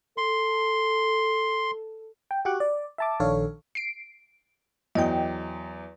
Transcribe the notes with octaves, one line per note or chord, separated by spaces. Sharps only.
A4 C6
G5
F#4 G4 C#6 D6 F#6
D5
E5 A5 D6
A#1 D#3 D4 A4 C#5 F5
C7 D7
E2 F#3 D#5 G5